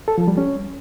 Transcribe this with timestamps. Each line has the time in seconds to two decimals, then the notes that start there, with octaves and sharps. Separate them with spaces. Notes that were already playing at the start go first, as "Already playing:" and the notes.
0.08 A4
0.18 F3
0.28 G3
0.38 C#4